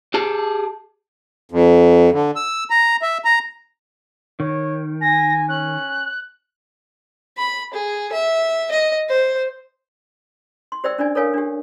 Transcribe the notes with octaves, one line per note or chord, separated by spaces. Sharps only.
G4 G#4 A5
F2
D3
E6
A#5
E5
A#5
D#3 C#5
G#5 A#6
C#4 F#6
B5
G#4
E5
D#5
C5
C6
G4 C5 D5 E5 G5 E6
C#4 D4 D5 G#5
A4 A#4 C#5 F5 G#5
D4 G4